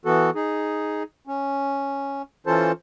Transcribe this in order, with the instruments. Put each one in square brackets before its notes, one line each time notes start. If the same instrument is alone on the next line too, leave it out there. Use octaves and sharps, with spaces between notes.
[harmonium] E3 B3 F#4 A4
D#4 G#4
C#4
E3 C#4 F4 A4 C5 A5